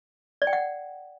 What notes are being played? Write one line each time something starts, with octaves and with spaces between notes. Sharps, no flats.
D5
G5
F#5